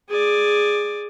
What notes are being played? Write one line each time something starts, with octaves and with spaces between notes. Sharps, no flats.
G#4 D5